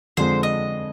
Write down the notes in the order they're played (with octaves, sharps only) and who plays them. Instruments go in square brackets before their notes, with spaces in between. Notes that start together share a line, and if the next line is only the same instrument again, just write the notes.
[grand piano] F2 D3 F3 G#3 [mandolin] C5
[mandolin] D#5